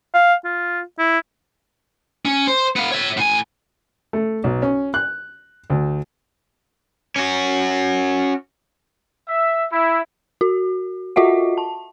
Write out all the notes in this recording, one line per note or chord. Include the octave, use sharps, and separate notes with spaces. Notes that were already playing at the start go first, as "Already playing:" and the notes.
F5
F4
E4
C#4
C5
B3 F5
C#5 E5
A2 G#5
A3
B1
C#4
F#6
D2
C#4 F#4
E5
E4
F#4
F4 F#4 D#5 E5 F#5
A5